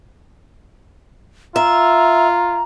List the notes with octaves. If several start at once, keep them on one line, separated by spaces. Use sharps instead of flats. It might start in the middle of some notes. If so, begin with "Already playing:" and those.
F4 E5 A#5